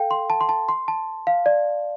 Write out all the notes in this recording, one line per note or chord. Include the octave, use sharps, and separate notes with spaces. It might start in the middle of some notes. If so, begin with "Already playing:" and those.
Already playing: A4 F5 G5
C6
A5
C6
A5
C6
A5
F5
D5